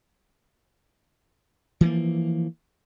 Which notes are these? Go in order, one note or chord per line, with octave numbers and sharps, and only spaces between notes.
E3 F3 A3 A#3